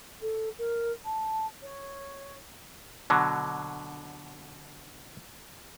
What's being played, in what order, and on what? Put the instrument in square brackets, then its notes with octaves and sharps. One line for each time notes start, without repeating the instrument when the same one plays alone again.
[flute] A4
A#4
A5
C#5
[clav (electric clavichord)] B2 D3 F#3